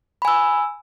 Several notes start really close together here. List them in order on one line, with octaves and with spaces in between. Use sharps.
B5 G#5 E6